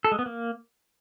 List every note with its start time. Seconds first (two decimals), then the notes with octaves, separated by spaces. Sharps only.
0.04 A4
0.12 G#3
0.19 B3
0.26 A#3